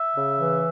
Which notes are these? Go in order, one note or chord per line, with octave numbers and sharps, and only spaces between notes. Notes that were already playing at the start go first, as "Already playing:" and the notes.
Already playing: E5
C#3
E3